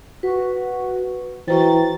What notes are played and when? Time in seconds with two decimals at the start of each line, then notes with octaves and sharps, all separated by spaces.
0.23 F#4 B4 C#6
1.48 E3 F#4 C5 G5 A#5 C#6 A6